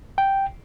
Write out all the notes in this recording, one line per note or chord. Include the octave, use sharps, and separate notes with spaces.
G5